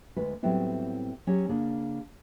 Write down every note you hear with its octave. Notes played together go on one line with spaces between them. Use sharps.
D2 G#3 A3 B4
A2 F#3 G3 B3 C4 E4
F#3 C#4 G4 G#4 C#5
C#3 A#3 D4 G#4